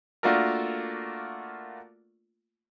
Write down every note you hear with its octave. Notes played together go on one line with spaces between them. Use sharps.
A3 A#3 D4 F4 F#4 A#4